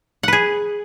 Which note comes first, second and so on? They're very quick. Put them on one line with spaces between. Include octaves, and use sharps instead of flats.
F#5 B4 G#4